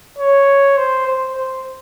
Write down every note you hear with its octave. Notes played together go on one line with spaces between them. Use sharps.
C#5
C5
C5
C5